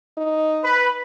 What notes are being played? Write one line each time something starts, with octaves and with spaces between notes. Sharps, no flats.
D#4
B4 B5